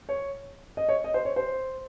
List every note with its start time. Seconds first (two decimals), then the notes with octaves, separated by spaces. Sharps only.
0.09 C#5
0.77 D#5
0.89 C#5
1.04 D#5
1.14 C5
1.25 C#5
1.36 C5